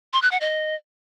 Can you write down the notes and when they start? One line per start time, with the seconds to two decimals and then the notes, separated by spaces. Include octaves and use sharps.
0.13 C6
0.22 F#6
0.31 F#5
0.41 D#5